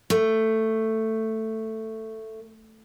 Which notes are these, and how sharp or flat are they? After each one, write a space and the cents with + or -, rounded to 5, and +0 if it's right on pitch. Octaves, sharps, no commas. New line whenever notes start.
A3 +10